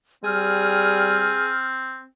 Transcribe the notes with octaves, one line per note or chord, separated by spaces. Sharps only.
G3 C4 G#4 F6